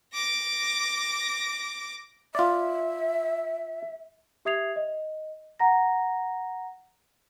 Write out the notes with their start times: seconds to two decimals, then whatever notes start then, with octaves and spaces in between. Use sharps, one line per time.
0.14 D6 A#6
2.35 F4 D5 E5
4.45 G4 E5 D#6 G#6 C7 F7
4.76 D#5
5.60 F#5 A#5 A#6